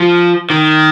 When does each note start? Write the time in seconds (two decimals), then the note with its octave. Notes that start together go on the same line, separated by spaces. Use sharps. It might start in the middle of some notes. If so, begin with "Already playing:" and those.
Already playing: F3
0.50 D#3